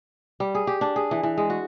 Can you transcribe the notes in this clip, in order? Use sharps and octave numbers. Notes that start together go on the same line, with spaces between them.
G3
G#4
G4
D4
G#4
E3
E3
G#3
F#4